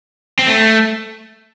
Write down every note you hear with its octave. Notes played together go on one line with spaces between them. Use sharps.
C4
A3